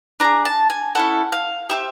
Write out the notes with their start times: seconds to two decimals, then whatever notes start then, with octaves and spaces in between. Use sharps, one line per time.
0.20 D4 F4 G#4 A#5
0.45 A5
0.70 G#5
0.95 C#4 E4 A4 F#5
1.32 F5
1.69 C4 E4 G4 E5